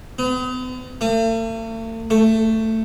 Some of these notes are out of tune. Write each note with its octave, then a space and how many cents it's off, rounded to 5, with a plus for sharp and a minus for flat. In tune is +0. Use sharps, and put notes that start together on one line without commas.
B3 +45
A3 +45
A3 +15